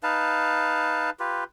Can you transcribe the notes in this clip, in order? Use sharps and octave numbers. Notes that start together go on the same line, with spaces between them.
D#4 B4 F5 A5
F4 G4 B4